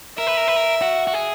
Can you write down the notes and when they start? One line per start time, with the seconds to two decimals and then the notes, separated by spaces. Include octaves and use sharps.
0.18 A#4 E5
0.27 B4
0.37 A#4
0.48 B4
0.57 A#4
0.82 F#4
1.07 F#4
1.14 G#4